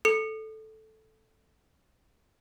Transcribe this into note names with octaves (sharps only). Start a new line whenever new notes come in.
A4 C#7